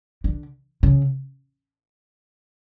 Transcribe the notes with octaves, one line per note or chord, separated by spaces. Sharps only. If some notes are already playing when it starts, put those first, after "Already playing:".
D3
C#3